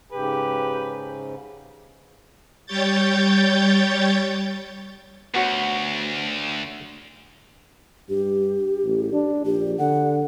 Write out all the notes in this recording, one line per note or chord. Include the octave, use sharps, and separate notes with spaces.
G#2 C#3 G4 B4
G3 G4 C#5 G6 A6
D2 B3 F#4 C#5
G2 G4
A1
D4
A#1 G4
D3 F#5